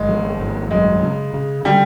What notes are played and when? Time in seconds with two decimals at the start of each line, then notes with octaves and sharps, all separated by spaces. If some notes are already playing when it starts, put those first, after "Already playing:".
Already playing: G#1 G#3
0.09 F3
0.40 G#1
0.71 F#2 G#3
1.02 C#3
1.33 C#3
1.64 D3 G3